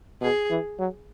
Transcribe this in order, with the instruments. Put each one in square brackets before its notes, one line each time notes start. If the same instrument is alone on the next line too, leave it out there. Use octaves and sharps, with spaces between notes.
[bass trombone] B2 [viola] G#4
[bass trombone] E3
F#3